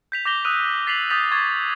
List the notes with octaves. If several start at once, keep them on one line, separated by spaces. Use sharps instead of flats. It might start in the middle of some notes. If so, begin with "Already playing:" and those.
G6 B6 F7
D6 G6 A#6 F7 G7
D#6 E6 F#6 D#7 F7
A6 B6 C7 F7 F#7
D#6 G6 A6 B6 F7
C#6 D6 G#6 A6